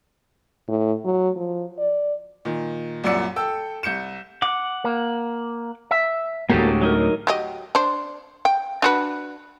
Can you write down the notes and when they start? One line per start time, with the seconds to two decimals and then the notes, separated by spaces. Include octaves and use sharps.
0.68 A2
1.05 F#3
1.36 F3
1.79 D5
2.45 A#2 D#3
3.04 C2 F#2 A#2 D5 E6 C#7
3.36 A4 G5 E6
3.83 C2 G6 C#7 E7
4.42 F#5 D6
4.84 A#3
5.91 E5
6.50 D2 A2 G#3 A#3 F#4 G4 A4
6.81 F#3 D#4 A#4
7.27 F#3 G4 D#5
7.75 D4 C5
8.45 G5
8.82 D4 F#4 B4